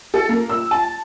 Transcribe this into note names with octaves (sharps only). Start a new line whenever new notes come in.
A4
A#3
E6
A5